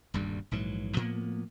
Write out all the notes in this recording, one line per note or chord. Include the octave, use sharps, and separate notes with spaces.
D#1 D2 G2 G3
A#1 G#2 E3 F#3
A2 F3 A#3 B3